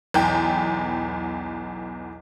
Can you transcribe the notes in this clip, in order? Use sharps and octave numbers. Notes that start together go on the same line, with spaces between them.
B1 E2 G5